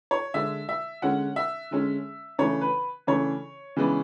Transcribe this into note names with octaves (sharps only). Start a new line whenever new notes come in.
C#5
D3 G#3 D4 E5
E5
D3 G#3 C#4 F#5
E5
D3 G#3 C#4
C#3 E3 A3 D4 C#5
B4
C#3 E3 A3 D4 C#5
C#3 E3 G#3 B3 D4